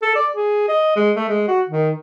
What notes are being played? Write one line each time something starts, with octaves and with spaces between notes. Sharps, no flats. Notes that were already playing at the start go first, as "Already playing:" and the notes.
A4
D5
G#4
D#5
G#3
A3
G#3
F#4
D#3